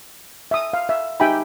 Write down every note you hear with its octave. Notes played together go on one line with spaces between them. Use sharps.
E5 D#6
F5
E5
D#4 G4 E5 G5 G#5 B5